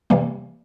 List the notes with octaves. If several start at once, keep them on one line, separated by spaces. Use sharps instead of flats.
C3 E3 G3 A#3